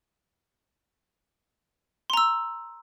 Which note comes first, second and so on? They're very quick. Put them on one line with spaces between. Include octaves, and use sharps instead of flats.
C6 A#5 E6